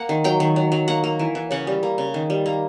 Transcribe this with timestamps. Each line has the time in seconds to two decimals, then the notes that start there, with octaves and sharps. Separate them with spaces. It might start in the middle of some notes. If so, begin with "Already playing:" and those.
Already playing: A#3 F#5
0.09 D#3
0.24 F#3 G5
0.40 D#3
0.56 F#3
0.72 F#3
0.88 A#3 F#5
1.04 A#3
1.19 E3
1.35 E3
1.51 C#3 F#5
1.67 G3
1.83 A#3
1.98 C#3
2.14 D#3
2.30 G3
2.46 A#3